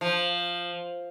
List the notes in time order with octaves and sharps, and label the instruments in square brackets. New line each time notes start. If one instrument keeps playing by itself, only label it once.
[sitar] F3